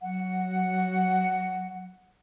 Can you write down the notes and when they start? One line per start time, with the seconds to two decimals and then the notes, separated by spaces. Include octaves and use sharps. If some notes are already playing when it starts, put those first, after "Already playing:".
0.01 F#3 F#5